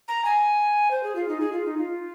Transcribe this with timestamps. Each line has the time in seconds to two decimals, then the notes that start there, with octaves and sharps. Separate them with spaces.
0.08 A#5
0.25 G#5
0.91 C5
1.03 G#4
1.16 F4
1.28 D#4
1.40 G#4
1.53 F4
1.65 D#4
1.78 F4